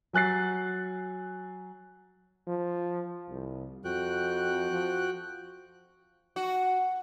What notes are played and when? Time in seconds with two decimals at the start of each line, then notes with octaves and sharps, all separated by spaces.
0.13 F#3 G#5 F#6 A6 C7
2.48 F3
3.30 C2
3.85 F2 F#4 G5 F#6
4.72 F3
6.36 F#4